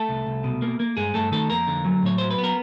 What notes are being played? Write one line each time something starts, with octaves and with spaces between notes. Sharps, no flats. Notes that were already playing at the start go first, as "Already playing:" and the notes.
Already playing: A3 A4
C2
C2
B2
A#3
A#3
G2 G#3 G#4
G2 A3 A4
D#3 A3 A4
F2 A#3 A#4
D3
F#3
A2 C#5
F#3 C5
B4
B3
A#4